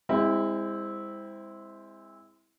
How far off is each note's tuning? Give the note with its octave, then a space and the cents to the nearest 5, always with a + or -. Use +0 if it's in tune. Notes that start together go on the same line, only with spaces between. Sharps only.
G#3 -35 C4 +0 E4 -15